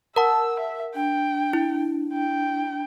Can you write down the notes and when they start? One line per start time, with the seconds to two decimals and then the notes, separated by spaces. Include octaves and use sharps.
0.16 A#4 F#5 A5 E6
0.60 E5
0.95 D4 G5
1.53 E4
2.13 G5